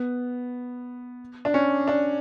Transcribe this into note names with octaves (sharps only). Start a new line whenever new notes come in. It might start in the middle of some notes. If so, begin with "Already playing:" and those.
Already playing: B3
D4
C#4
D4